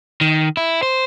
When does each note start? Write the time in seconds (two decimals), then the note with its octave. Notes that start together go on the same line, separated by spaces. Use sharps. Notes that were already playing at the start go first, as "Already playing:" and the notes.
0.21 D#3
0.57 E4
0.83 C5